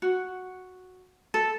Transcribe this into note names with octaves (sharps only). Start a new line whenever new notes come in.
F#4
A4